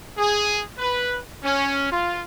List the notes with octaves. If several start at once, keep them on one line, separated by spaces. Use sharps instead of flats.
G#4
B4
C#4
F4